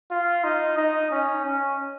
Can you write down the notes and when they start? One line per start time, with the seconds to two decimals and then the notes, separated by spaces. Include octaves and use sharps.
0.11 F4
0.44 D#4
0.77 D#4
1.11 C#4
1.45 C#4